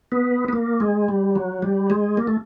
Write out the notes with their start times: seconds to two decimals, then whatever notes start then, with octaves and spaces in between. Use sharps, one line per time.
0.12 B3
0.48 B3
0.53 A#3
0.80 G#3
1.08 G3
1.35 F#3
1.62 G3
1.90 G#3
2.17 A#3
2.27 A3